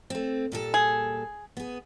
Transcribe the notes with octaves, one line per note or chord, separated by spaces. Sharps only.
A3 C4
A#2 G3 A4
G#4
B3 G#4